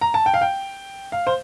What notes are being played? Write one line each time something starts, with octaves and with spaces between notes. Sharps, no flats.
A#5
A5
G5
F5
G5
F5
C5